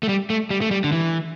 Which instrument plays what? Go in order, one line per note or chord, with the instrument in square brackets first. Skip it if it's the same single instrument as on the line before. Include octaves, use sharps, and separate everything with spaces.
[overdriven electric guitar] A3
G3
A3
G3
A3
G3
D3
E3